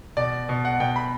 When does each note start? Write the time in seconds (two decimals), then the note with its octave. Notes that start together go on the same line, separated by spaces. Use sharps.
0.17 B2 D5
0.49 B2
0.65 F#5
0.80 B2 G5
0.96 B5